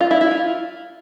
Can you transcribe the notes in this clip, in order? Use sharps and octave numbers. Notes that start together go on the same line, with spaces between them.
F4
E4
E4
F4